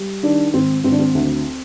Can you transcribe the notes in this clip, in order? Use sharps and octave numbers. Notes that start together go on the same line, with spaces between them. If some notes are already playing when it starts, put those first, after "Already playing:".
Already playing: G3
D#3 D4
G#1 C4
G#1 C4
D4
C4
D2